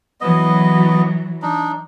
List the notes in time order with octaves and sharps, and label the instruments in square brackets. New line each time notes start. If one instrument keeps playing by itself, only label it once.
[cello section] E3 F#3 [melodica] B3 D#5
[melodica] D4 D#4